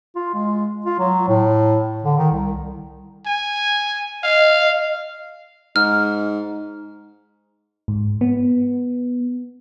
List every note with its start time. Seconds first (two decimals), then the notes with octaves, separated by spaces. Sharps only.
0.16 F4
0.34 G#3
0.86 F4
0.99 F#3
1.28 A2
2.04 D3
2.18 D#3
2.32 C2
3.27 G#5
4.24 D#5 F5
5.76 G#2 F6
7.88 G#2
8.21 B3